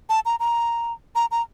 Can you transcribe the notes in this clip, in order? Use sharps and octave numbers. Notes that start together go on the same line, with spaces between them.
A5
A#5
A#5
A#5
A#5